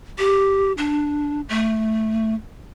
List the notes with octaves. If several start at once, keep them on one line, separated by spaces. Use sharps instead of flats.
G4
D4
A3